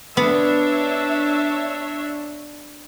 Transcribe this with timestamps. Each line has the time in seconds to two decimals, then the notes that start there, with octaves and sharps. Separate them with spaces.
0.17 B3 D4 C#5 E5